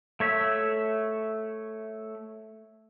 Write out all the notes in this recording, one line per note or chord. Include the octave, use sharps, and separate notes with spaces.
A3 C#5 E5